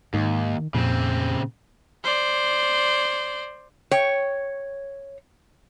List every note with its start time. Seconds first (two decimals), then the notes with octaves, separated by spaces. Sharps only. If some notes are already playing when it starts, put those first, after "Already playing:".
0.14 D#2 G#2 D#3
0.74 F2 A#2 C#3 C4
2.04 C5 D5
3.91 C#5 G5